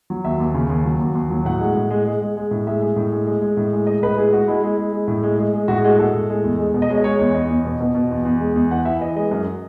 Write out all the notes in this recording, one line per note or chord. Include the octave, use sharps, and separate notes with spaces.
F#3
D#2 E5
D#2
C#3
D#2
F#3
D#2
D#2
F#3
A2 F#5
G#3
A2
G#3
G#3
G#3
G#3
A2
G#3 E5
G#3
A2
G#3
G#3
G#3
A2
G#3
G#3 D#5
A2 B4
G#3 G#4
G#3 F#4
G#3 E4
G#3
G#3
G#3
A2
G#3
G#3
G#3
A2 F#4
G#4
G#3 F#4
G#3 A4
A2
G#3
E2
G#3
B2
D#5
G#3 C#5
D#5
G#3 C#5
E2 C#5
E2 D#5
E2
B2
B2
B2
E2
E2
G#3
E2
E3 F#5
E3 E5
E3 D#5
G#3 D#5
F#2